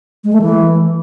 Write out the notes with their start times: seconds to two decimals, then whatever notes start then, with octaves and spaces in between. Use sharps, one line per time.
0.24 G#3
0.33 A3
0.41 E3